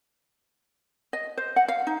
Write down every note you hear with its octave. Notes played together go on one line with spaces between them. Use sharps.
D#5
C5
F#5
F5
D#4